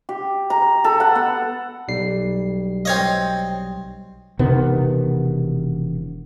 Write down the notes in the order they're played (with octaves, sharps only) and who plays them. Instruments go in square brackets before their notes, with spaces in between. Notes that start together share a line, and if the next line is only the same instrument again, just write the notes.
[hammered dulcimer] G4
A#5
A4
F#5
B3
[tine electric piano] B1 G3 C7
[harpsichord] C4 C#5 D#5
[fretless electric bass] E1 C3 D#3 B3